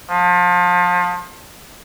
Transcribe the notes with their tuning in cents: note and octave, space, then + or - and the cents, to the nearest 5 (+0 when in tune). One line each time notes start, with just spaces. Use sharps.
F3 +30